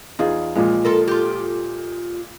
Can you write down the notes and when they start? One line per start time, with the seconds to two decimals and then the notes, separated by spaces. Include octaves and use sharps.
0.19 E2 D#4 F4 G#4
0.55 A#2 F3 G#3
0.85 F4 A4 A#4
1.08 F4 G4